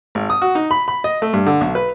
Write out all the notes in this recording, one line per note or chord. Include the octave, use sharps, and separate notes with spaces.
G#1
D#6
F#4
D#4
B5
B5
D#5
A3
G2
D3
B1
B4